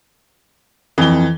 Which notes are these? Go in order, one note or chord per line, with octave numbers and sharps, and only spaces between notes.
F2 E3 G7